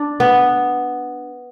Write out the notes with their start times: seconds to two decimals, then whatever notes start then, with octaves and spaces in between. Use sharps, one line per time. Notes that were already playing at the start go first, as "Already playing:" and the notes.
Already playing: D4
0.20 B3